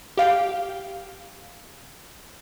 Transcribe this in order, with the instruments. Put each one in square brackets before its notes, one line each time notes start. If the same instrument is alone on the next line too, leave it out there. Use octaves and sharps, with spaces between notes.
[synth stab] G4 F5 G5